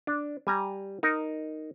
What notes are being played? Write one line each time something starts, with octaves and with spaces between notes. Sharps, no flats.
D4
G3 G#5 A#5
D#4 A#4